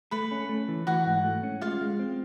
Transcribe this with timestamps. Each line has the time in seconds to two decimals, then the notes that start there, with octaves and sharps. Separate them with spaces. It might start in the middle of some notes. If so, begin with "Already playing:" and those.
0.11 A3 B4 B5
0.31 C#4
0.49 A3
0.68 E3
0.87 E3 F#4 F#5
1.06 G#2
1.24 A3
1.43 C#4
1.61 G#3 F4 F5
1.81 G#3
1.99 C4